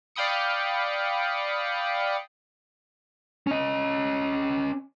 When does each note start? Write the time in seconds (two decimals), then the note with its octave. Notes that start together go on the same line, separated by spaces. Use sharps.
0.16 D5 F5 G5 B5 D#6 C#7
3.47 C#4 D#5